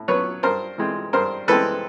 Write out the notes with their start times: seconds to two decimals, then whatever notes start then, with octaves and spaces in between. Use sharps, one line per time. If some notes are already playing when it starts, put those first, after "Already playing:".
Already playing: A2
0.08 F#3 B3 B4 C#5
0.43 G2 A#4 C5
0.78 E3 G#3 C4
1.13 G2 A#4 C5
1.48 E3 G#3 C4 A4 B4